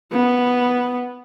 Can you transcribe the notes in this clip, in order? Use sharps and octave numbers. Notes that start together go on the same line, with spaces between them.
B3